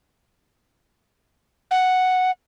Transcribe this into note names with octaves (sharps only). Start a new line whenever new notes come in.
F#5